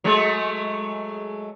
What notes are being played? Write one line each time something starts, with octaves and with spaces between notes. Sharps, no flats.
F#3 G#3 A3